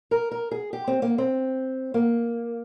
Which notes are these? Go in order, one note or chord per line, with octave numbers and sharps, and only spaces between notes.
A#4
A#4
G#4
G4
C4
A#3
C4
A#3